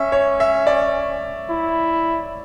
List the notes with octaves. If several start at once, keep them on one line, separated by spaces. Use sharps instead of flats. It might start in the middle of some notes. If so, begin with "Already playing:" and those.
Already playing: C#4 E5
C#5
E5
D5
E4